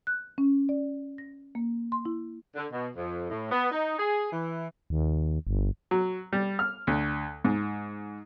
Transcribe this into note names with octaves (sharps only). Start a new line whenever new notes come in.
F#6
C#4
D5
A#6
A#3
C6
E4
D3
B2
F2
A2
B3
D#4
G#4
E3
D#2
G1
F#3
G3
F6
D2
G#2